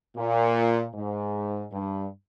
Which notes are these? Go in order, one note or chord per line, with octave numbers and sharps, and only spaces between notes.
A#2
G#2
G2